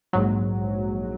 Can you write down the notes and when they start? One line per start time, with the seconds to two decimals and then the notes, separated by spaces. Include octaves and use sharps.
0.13 A#1 G#2 F#3